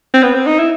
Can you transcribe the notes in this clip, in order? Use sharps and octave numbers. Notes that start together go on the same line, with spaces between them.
C4
B3
C4
D#4
E4